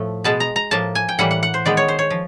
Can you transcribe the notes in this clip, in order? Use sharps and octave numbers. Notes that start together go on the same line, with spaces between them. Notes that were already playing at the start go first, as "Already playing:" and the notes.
Already playing: A2 F3 A3
B2 G#3 B3 A5
A#5
A#5
A2 F3 A#3 A5
G#5
G5
A2 E3 G3 A#3 F#5
F#5
F#5
C5
D#3 G#3 B3 D5
C#5
C5
C#5
F3